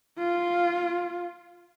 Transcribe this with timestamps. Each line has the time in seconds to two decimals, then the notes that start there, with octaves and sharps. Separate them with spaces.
0.19 F4